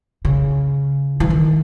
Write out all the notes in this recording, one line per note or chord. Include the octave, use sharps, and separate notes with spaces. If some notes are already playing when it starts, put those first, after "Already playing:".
C#3
E3
D#3